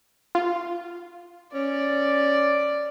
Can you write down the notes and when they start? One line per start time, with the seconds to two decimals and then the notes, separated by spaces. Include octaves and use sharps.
0.35 F4
1.54 C#4 D5